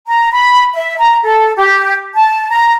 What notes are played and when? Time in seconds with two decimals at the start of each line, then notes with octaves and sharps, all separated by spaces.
0.07 A#5
0.31 B5
0.74 E5
0.98 A#5
1.23 A4
1.56 G4
2.16 A5
2.50 A#5